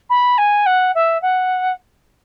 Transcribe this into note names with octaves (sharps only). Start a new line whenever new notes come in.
B5
G#5
F#5
E5
F#5